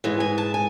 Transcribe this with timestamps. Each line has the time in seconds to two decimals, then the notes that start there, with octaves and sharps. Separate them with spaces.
0.04 G#2 E3 G#3
0.20 G#5
0.38 A5
0.54 G#5